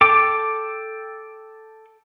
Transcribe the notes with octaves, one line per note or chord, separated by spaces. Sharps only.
A4 G5 D6